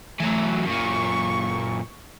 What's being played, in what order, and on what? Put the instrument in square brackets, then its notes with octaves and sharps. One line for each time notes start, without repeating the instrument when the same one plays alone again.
[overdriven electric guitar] E3 F#3 [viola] A3
[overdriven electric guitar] F#2 A#2 [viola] C#6